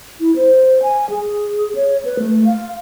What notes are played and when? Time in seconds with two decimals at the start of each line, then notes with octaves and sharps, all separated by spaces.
0.20 E4
0.36 C5
0.83 G#5
1.10 G#4
1.75 C#5
2.05 B4
2.19 A3
2.45 F5